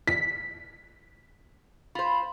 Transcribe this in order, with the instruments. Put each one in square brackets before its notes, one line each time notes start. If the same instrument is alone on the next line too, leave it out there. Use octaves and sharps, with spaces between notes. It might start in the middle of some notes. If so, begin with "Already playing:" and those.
[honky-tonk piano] B6
[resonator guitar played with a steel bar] F4 C5 [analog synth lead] B5